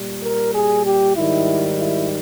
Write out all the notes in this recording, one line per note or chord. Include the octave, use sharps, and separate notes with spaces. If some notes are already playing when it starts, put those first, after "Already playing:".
Already playing: A#2 G3
A#4
G#4
G4
G#2 D#3 G3 E4
E4